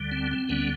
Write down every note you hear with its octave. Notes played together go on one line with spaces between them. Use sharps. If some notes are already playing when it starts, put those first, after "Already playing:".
Already playing: D2 D3 G3
C4
C4
D2 D3 G3 B3 C#4